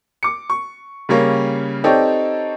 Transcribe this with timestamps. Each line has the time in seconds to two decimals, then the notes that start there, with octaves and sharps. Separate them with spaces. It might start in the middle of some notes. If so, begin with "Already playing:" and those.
0.23 D6 C#7
0.50 C#6
1.09 C#3 G3 A#3 C#4
1.84 C4 D#4 G4 A4 C#5 D5